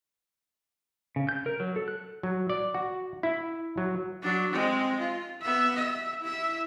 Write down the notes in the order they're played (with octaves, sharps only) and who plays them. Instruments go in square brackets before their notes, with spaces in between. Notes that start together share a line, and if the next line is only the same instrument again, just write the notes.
[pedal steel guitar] C#3
G6
A#4
F#3
A4
F#6
[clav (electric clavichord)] F#3
D5
F#4
E4
F#3
[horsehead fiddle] F#3 D4
G#3 C4
F4
B3 E5
E5
E4 E5